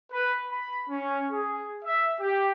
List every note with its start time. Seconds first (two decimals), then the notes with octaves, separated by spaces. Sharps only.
0.11 B4
0.50 B5
0.88 C#4
1.30 G#4
1.84 E5
2.19 G4